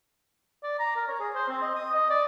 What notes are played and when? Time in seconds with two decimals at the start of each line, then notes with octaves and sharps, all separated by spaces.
0.63 D5
0.79 A#5
0.97 A#4
1.08 C#5
1.20 G#4
1.35 C5
1.49 C4
1.62 D#5
1.76 D#6
1.94 D#5
2.10 D5